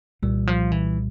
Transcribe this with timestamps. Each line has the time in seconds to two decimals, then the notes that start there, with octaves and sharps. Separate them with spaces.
0.23 C2 A#2 E3 G3
0.47 F3
0.72 E3